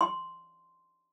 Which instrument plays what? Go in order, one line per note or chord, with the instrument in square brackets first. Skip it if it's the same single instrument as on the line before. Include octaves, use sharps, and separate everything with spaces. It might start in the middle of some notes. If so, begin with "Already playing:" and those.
[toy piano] C6